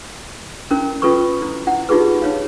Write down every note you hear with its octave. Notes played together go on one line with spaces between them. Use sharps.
C#4 E4 A#4
C#4 F4 A4 B4 C#6
E4
E4 F#5
D#4 F4 G4 G#4 B4
D#4 C#5 F5